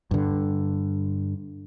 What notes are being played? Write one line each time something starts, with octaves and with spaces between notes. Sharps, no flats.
G2 D3